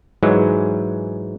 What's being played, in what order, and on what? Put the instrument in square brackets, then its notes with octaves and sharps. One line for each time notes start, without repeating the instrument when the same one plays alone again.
[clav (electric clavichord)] G#2 E3 F#3 G#3